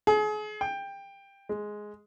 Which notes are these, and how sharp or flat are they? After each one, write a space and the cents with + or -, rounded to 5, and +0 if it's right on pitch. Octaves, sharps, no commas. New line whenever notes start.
G#4 +35
G5 +15
G#3 +5